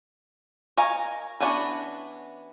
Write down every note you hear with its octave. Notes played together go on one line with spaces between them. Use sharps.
A#4 C#5 D#5 F5 G#5
E3 B3 C#4 D4 F#4